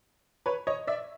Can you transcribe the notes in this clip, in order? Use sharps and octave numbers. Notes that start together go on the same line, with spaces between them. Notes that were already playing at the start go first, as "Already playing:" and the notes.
B4 C#5
C#5 D#5
D5 E5